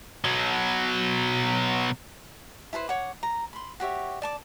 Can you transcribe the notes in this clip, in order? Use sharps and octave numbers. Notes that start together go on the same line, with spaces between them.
B2 F#3
E4 A4 B4 C5
C#5 F#5 D6
A#5
B5 C6
F#4 G4 C#5 E5
D5 A5 D6